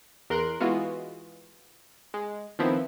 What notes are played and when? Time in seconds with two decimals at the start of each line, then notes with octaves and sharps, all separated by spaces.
0.30 E2 A#4 C6 F#6 D7
0.60 E3 G#3 B3 F4 F#4
2.14 G#3
2.59 D#3 F3 B3 C4 E4